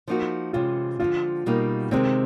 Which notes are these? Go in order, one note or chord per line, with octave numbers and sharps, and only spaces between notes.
F3 A#3 D#4 F#4
C3 E3 G#3 C#4 F4
D3 F3 G#3 C4 F4
B2 G3 A#3 D#4
C3 D#3 G#3 C4